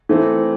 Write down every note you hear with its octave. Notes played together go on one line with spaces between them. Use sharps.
E3 A3 C4